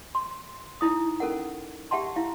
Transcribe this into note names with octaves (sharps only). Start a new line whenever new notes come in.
C6
D#4 E4 D#6
C#4 A4 A#4 F#5
G4 E5 F#5 A5 C6
E4 F5